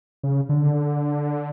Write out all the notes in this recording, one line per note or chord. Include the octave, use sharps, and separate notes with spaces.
C#3
D3